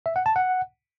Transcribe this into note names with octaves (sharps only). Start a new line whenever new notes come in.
E5
F#5
A5
F#5